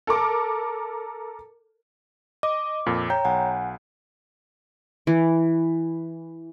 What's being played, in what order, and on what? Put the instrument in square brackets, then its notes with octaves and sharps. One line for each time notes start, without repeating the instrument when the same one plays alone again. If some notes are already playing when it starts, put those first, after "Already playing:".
[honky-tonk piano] A4 A#4 D6
[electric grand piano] D#5 [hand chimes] D6
[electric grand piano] F2 A#2
[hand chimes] C#5 G5 A#5 [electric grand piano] G6
[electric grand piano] B1 [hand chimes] F#5 G#5
[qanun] E3